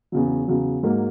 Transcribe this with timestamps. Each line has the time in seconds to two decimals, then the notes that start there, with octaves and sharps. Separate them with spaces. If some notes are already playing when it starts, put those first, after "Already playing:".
0.12 E2 C#3 F#3
0.48 E2 C#3 F#3
0.83 G#2 F#3 A#3